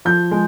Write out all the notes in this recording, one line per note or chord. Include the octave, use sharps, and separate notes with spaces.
F3 G6
G#3